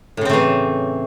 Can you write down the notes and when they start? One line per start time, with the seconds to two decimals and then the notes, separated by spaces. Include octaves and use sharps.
0.17 A2
0.21 C#3
0.25 C4
0.29 A3
0.33 E3